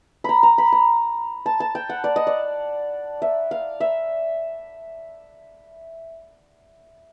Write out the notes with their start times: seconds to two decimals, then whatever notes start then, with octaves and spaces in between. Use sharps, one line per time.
0.24 A#5 B5
0.43 A#5
0.58 B5
0.72 A#5
1.46 A5
1.60 A5
1.75 G5
1.89 F#5
2.04 D5
2.16 D#5
2.27 D5
3.22 E5
3.51 F5
3.80 E5